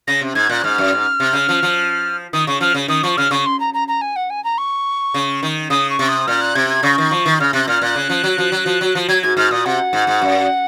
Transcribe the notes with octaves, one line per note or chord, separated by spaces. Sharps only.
C#3 A#6
C3
G#2 G#6
A#2 F#6
G#2 F6
F#2
G#2
C3
C#3
F3
F3
D#3 D#6
C#3 C#6
F3 F6
C#3
D#3 D#6
F3 C#6
C#3 F6
C#3 C#6
C6
A#5
A#5
A#5
G#5
F#5
G#5
A#5
C#6
C#3
D#3
C#3 D#6
C#6
C3
D#6
A#2 F6
F#6
C3 G#6
G#6
C#3 C#6
D#3
F3
D#3
C#3 F6
C3 F#6
A#2 F6
A#2 F#6
C#3
F3
F#3
F3
F#3
F3
F#3
F3
F#3 G#6
G#2 G#6
G#2 F6
A#2 D#6
C3 F#5
G#2
G#2
F#2